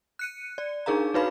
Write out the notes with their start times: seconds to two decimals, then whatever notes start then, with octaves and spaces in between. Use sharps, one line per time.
0.19 F#6 C#7 D#7
0.58 D5
0.86 D4 D#4 G#4 A#4 F5 A#5
1.14 D#4 F#4 B4 C#5 F5 B5